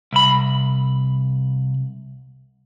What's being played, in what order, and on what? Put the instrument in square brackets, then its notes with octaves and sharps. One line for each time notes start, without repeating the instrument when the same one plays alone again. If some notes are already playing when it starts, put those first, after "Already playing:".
[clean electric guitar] C2 B5